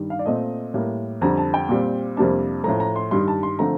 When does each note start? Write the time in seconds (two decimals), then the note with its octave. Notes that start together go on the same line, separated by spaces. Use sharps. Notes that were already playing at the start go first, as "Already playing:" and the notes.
Already playing: G2 D#3 G3
0.10 F5
0.19 D5
0.26 A#2 A3 C4 D#5
0.74 A2 G3 A#3
1.21 F2 D3 G3 A#5
1.37 A5
1.54 G5
1.69 A#2 G3 C4
2.17 F2 C3 G3 A#3 D4 A5
2.64 A2 F3 A3 A#5
2.80 A#5
2.96 C6
3.11 G2 D#3 G3 C6
3.28 A5
3.43 C6
3.59 D3 F3 A3 C4 A#5